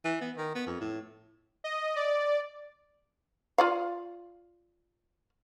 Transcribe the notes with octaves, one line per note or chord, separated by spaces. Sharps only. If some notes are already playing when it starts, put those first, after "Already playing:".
E3
B3
D#3
B3
F2
A2
D#5
D5
F4 D5 F5